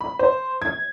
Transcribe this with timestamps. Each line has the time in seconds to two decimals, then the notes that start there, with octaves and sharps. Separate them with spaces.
0.01 B5
0.19 C5
0.62 G#6